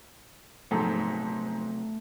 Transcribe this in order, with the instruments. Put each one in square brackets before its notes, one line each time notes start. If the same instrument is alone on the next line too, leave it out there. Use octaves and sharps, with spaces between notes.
[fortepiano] A#1 G#2 A4 [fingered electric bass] C3 F#3 B3 [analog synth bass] A3